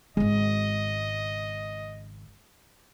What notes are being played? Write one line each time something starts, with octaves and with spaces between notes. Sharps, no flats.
G#1 C#3 G#3 D#5